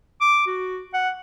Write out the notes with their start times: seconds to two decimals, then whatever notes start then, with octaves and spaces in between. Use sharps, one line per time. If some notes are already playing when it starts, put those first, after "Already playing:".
0.21 D6
0.47 F#4
0.94 F#5